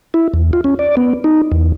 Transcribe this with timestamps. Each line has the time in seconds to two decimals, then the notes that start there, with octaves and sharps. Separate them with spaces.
0.14 E4
0.34 E2
0.53 F4
0.64 C#4
0.79 D5
0.97 B3
1.24 D#4
1.52 E2